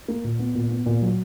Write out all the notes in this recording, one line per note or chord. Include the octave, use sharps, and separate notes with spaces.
A#3
A#2
B3
A#2
B3
A#2
F#3